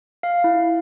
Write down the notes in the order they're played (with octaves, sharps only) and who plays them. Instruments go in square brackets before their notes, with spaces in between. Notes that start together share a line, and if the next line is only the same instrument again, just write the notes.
[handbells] F5
E4